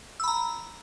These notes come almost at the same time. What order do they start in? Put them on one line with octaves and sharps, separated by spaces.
E6 B5 A#5